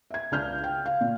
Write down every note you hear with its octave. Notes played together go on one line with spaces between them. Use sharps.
E5 G#6
C#2 D4 F6 G6
G5
F5
A#2